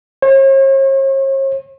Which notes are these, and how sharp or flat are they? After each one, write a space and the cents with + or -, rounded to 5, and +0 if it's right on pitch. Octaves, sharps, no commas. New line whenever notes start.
C#5 -45